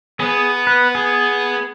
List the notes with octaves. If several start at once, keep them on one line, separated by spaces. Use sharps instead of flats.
B3 G#4
B4
G#4